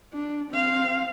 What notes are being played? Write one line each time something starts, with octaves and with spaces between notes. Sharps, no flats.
D4
C4 F5